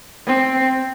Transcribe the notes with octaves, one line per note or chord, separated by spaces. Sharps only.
C4